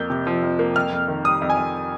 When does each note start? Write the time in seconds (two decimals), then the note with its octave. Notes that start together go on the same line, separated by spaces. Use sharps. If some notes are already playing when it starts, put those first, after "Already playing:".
Already playing: F2 A#3 G6
0.10 C3
0.27 F3
0.43 F2
0.59 A#3
0.76 F2 F6
0.92 F2
1.08 D#3
1.25 G3 D#6
1.42 F2
1.50 G#5
1.57 F2